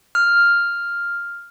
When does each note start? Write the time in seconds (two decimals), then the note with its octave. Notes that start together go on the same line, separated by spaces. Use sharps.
0.15 F6